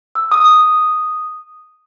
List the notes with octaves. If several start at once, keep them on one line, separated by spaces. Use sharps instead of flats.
E6
D#6